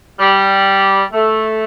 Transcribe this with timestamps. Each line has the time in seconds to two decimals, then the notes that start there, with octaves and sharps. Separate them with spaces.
0.19 G3
1.13 A3